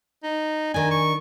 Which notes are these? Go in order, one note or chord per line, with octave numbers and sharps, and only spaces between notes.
D#4
D#3 D4 G#5
C#6